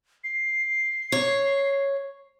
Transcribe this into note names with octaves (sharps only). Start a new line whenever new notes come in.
C7
C#5